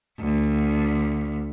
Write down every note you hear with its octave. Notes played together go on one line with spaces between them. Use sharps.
D2